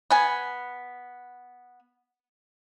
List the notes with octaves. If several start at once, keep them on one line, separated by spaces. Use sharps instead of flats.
B3 G#5